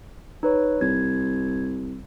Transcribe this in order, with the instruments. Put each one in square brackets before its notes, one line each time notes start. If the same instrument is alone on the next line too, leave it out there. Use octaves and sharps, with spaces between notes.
[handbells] D#4 B4 C#5
[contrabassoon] C2 [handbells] G#6